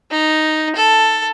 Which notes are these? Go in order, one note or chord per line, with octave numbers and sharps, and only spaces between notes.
D#4
A4